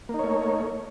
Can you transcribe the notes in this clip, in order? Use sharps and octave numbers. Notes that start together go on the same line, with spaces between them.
A3 A#3 D#4 C#5